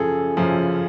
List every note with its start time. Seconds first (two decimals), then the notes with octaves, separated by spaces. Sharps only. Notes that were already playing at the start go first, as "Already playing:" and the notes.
Already playing: F#2 C#3 F3 G#4 A4
0.37 F#2 C#3 F3